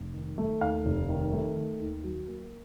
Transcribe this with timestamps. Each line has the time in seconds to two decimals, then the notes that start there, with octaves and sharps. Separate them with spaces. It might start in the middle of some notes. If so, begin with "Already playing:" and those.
Already playing: F1
0.14 D#3
0.38 A3
0.61 D#2 F5
0.85 F1
1.09 D#3
1.32 A3
1.57 D#3
1.80 D#2
2.03 F#3
2.27 A#3